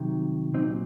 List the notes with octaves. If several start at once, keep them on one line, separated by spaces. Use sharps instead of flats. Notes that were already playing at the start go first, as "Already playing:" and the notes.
Already playing: C2 C3 D#3 F#3
C2 A#2 F#3 C4 D#4